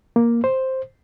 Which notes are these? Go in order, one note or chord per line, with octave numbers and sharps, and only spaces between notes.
A#3
C5